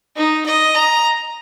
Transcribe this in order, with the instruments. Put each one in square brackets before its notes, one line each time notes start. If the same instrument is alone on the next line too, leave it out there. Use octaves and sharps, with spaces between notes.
[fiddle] D#4
D#5
A#5